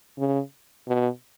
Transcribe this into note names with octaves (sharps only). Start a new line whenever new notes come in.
C#3
B2